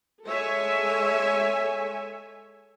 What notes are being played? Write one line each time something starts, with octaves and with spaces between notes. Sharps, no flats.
G#3 A4 C#5 E5 G#5